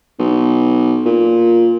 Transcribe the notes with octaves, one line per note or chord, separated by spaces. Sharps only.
B1
A#2